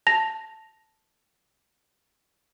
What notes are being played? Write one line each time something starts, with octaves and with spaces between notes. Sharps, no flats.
A5 A#6 F7